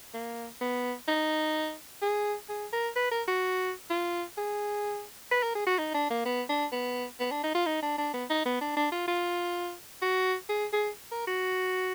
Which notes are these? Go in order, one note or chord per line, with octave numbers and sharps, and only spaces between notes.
A#3
B3
D#4
G#4
G#4
A#4
B4
A#4
F#4
F4
G#4
B4
A#4
G#4
F#4
D#4
D4
A#3
B3
D4
B3
B3
D4
D#4
F4
D#4
D4
D4
B3
D#4
B3
D4
D4
F4
F4
F#4
G#4
G#4
A#4
F#4